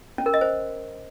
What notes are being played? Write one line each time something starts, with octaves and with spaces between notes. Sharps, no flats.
C#4
A#4
D#5
C5